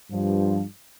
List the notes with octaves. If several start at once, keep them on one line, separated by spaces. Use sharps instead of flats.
G2 F3